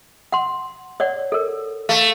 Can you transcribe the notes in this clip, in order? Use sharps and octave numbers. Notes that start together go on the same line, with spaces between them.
F#5 C6
C#5 D5 F#5
A4 A#4
A3 F5